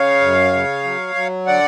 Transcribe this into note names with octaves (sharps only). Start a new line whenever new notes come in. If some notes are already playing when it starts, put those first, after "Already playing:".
Already playing: C#3 C#5 F5
F#2
C#3
F#3
F#3
D3 D5 F#5